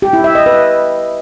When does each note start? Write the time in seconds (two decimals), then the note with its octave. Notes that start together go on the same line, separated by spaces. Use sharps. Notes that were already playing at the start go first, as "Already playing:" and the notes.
0.02 G4
0.13 E4
0.24 E5
0.35 D#5
0.46 B4